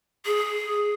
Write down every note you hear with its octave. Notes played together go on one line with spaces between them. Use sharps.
G#4